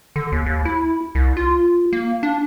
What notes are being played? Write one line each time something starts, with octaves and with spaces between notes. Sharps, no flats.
D3
D#2
D#2
E4
C2
F4
A#3
D4